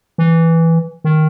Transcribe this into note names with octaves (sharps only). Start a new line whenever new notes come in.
E3
D#3